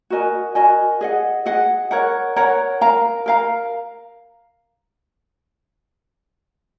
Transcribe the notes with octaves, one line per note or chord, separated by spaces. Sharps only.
F#4 A#4 D#5 G#5
F#4 A#4 D#5 G#5
G#4 D#5 F#5
G#4 D#5 F#5
A#4 C#5 F#5 A#5
A#4 C#5 F#5 A#5
A#4 F5 A#5
A#4 F5 A#5